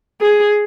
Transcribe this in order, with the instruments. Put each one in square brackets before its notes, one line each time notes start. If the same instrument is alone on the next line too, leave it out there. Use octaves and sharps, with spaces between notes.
[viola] G#4